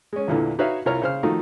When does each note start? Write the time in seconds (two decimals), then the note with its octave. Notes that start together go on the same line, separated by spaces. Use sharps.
0.13 G#3 C#4
0.28 E2 A#2 D3 E3
0.59 D#4 F#4 B4 C#5 E5 F5
0.86 C2 F4 A#4 C#5 A#5 F6
1.02 C#3 C5 F6
1.23 D#3 F3 A3 D#4 F#4